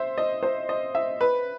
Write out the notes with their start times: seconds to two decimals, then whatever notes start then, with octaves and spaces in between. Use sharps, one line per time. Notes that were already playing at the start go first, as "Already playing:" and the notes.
Already playing: C5 E5
0.18 D#5
0.43 C5
0.69 D#5
0.95 E5
1.21 B4